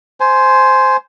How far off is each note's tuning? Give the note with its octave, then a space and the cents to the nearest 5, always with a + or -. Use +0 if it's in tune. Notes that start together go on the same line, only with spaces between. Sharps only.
C5 +0 G#5 +20